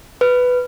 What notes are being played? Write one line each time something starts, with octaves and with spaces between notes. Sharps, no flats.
B4